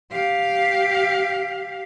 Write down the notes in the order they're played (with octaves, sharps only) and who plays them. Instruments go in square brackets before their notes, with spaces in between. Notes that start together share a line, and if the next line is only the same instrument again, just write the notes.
[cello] G4 F5